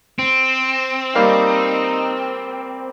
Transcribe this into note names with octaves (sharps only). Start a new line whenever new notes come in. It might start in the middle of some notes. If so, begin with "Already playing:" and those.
C4
G3 A#3 D#4 F5